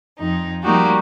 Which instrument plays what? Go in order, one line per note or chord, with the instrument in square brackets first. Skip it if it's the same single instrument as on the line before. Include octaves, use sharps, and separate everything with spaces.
[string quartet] F2 D#4
F3 G3 A#3 D#4 F#4 G4